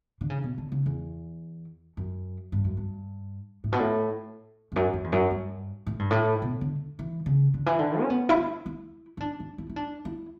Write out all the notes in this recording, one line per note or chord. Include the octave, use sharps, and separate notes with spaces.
D3
C#3
B2
D3
C#3
E2
F#2
G2
F#2
G2
A2
B2
A2
E2
F#2
F#2
E2
F#2
G2
A2
G2
A2
B2
D3
E3
C#3
D3
E3
D3
C#4
B3
E4
D4
E4
E4
D4
D4
E4
E4
D4
E4